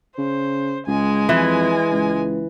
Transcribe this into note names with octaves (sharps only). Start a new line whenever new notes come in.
C#3 C5
C#2 G#3 G#5
F2 E3
C#2